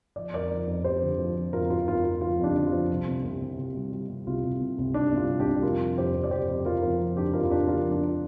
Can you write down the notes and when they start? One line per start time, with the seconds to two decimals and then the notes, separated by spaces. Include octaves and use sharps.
0.16 F3 D5
0.34 F2 A#4 D5
0.51 F3
0.67 F2
0.84 F3 G4 C5
1.02 D3
1.18 F3
1.36 F3
1.53 F2 F4 A#4
1.70 F2 F4 A#4
1.87 F2 F4 A#4
2.04 F2 F4
2.21 F3 F4
2.39 F2 D4 G4
2.56 D3
2.66 F4
2.72 F3
2.90 C2
3.07 C2
3.24 C2
3.41 C3
3.58 C3
3.75 G3
3.92 G3
4.09 C3
4.27 C2 F4
4.44 C2
4.61 C3
4.78 C2
4.94 C2 D4
5.12 C2 F4
5.30 G3
5.40 D4 G4
5.47 C2
5.63 F2 F4 A#4
5.80 F3
5.97 F2 G4 C5
6.14 F2
6.24 D5
6.31 F2 G4 C5
6.48 F2
6.65 F2 F4 A#4
6.82 F3 F4 A#4
6.99 F3
7.17 F2 D4 G4
7.33 F2 F4 A#4
7.44 F4
7.50 F2 D4 G4
7.67 F3 F4 A#4
7.85 F3
7.91 D4